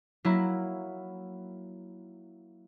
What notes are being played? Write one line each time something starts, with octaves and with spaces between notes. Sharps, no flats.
F#3 A#3 E4 B5